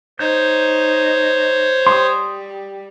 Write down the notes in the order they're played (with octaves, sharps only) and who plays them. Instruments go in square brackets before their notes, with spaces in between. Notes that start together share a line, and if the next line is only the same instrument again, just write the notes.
[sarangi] D#4 [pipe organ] C5 C#5 [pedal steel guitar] G6
[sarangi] G3 [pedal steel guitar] C6 D#6